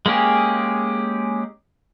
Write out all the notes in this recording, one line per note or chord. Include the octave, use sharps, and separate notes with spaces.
G#3 A#3 C#4 G4 G#4